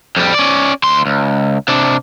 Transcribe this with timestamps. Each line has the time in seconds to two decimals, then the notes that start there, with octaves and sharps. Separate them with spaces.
0.16 F2 G3
0.34 C#4 D5
0.84 D2 C6
1.06 C#2
1.68 C3 D4